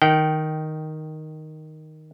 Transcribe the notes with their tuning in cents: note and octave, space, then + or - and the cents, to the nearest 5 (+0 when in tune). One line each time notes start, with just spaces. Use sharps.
D#3 +0 G5 -20